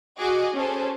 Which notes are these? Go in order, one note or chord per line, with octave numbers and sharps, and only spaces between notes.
F#4 G#4 D#5 D6
C#4 G#4 A4 C5